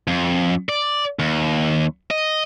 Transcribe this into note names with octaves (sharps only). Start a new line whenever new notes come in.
F2
D5
D#2
D#5